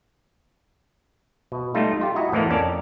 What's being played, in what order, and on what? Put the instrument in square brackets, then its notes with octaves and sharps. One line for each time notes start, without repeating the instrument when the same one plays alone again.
[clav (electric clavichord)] B2
G3 A3 D#4 F4
F4 G4
E4 F#4 D#5 A#5
A2 E3 F3 A#3 B3
F2 C#4 A#4 D5 A5